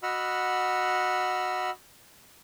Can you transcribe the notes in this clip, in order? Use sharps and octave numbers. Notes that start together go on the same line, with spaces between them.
F#4 D#5 F#5 B5 E6 F6